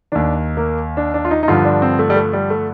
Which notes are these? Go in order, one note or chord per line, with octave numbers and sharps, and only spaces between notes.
D#2 D#3 D4
A#3
D4
D4
F4
D#4
D#4
G2 D3 F3 F4
D4
C4
A3
G3
A3
G3
A3